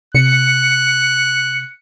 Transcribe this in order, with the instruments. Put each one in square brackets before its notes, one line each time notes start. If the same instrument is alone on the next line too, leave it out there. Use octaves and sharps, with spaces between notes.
[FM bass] C3 [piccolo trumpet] F#6 [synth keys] C#7